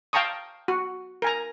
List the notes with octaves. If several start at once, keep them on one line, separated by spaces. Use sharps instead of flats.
F5 G5 A5 A#5 C#6 D#6
F#4
A#4 G#5 A#5